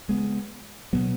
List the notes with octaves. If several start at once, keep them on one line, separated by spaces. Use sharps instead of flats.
C#3 G#3 B3
B2 F#3 B3